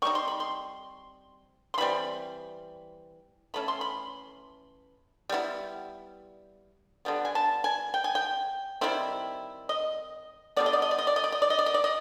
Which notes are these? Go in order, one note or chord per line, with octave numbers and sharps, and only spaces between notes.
G3 C4 D#4 C#6
C6
B5
C6
C6
E3 G3 C4 B5
E3 A3 C#4 B5
C6
B5
G3 B3 E4
D3 G3 B3
G#5
A5
G#5
G5
G#5
G5
D#3 G3 C4 E4
D#5
D3 G3 B3 D5
D#5
D5
D#5
D5
D#5
D5
D#5
D5
D#5
D5
D#5
D5
D#5
D5
D#5